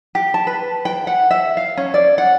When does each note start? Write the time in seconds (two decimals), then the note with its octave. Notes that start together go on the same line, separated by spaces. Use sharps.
0.15 G4
0.34 A5
0.47 B4
0.85 G5
1.07 F#5
1.31 E5
1.57 F5
1.77 C#4
1.94 D5
2.18 F#5